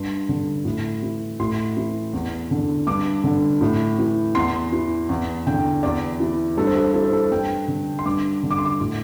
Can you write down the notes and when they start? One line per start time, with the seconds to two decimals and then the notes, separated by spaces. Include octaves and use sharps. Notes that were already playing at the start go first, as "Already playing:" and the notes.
Already playing: G2 C6
0.29 D3
0.65 A2
1.03 E3
1.39 A2 C6
1.77 E3
2.13 E2
2.51 D3
2.87 G2 D6
3.24 D3
3.61 A2
3.99 E3
4.35 E2 C6
4.72 E3
5.09 E2
5.47 D3 G5
5.83 E2 D5
6.20 E3
6.57 G2 A4
6.67 C5
6.76 A4
6.84 C5
6.94 E3 A4
7.03 C5
7.13 A4
7.32 G2 G5
7.68 D3
7.99 C6
8.05 G2 D6
8.43 D3
8.51 D6
8.58 C6
8.65 D6
8.80 A2